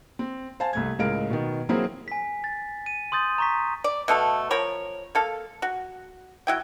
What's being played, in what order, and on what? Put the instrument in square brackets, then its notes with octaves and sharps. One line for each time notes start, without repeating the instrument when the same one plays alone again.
[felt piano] C4
C5 F5 G#5 A5
C2 A3 G#6
C#2 A2 G#3 A#4 F5 D7
B2 D#3
F#3 A#3 C4 E4 G#4 C5
[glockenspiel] G#5 B6
A6
D#7
C6 D#6 G6 A6
A#5 C#6 B6
[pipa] D5
B2 A3 A4 F5
F3 A#4 C#5 B5
A#3 A4 F5
F#4
F#3 E4 G5